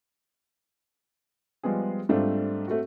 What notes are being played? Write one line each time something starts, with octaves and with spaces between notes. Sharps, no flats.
F3 G3 G#3 B3 G#4
G#2 G3 A3 C4 D4 F4
A3 C4 F#4